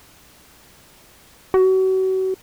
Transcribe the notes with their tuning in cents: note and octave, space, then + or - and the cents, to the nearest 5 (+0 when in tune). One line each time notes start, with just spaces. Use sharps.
F#4 +35